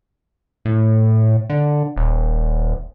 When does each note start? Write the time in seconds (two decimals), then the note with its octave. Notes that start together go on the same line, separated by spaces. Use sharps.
0.65 A2
1.50 D3
1.96 D#1